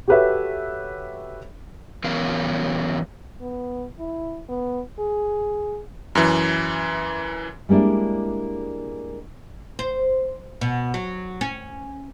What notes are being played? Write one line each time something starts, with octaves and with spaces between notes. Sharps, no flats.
F#4 G4 A4 B4 C#5 E5
E3 F#3 B3 C#4 A#4 F5
B3
E4
B3
G#4
F#2 E3
G3 G#3 A#3 D4 E4
C5
B2
F#3
C#4